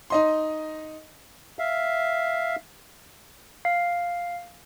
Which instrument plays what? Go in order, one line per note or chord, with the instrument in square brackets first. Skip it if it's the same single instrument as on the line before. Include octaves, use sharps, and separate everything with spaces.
[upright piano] D#4 D#5 C6
[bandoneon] E5 F5
[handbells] F5